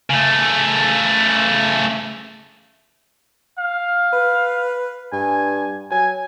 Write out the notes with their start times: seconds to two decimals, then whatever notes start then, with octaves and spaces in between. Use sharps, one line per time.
0.10 C#3 A3
3.59 F5
4.13 B4
5.13 G2 G#5
5.91 F#3 G#5